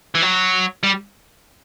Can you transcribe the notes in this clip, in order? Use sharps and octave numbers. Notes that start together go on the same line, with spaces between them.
E3
F#3
G3